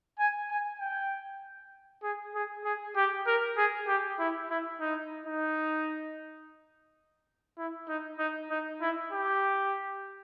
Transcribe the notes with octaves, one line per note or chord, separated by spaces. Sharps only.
G#5
G#5
G5
G#4
G#4
G#4
G4
A#4
G#4
G4
E4
E4
D#4
D#4
E4
D#4
D#4
D#4
E4
G4